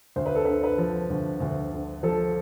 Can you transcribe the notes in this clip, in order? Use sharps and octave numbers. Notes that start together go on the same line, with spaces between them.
D2 C5
B4
A4
D3 B4
B4
F3
D2
D2
D3
F3 A4